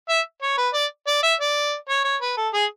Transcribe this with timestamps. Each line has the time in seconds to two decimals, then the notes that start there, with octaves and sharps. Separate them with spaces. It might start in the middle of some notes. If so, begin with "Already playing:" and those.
0.09 E5
0.42 C#5
0.58 B4
0.74 D5
1.07 D5
1.23 E5
1.40 D5
1.89 C#5
2.04 C#5
2.21 B4
2.37 A4
2.53 G#4